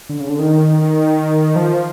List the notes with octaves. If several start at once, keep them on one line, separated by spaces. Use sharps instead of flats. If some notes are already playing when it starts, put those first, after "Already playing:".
D3
C#3
D3
D#3
F3